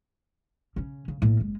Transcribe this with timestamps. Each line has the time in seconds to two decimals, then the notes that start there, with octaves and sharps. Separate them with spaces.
0.76 C#3 C#4
1.08 C#3
1.22 A2 A#3
1.39 F#1 G#3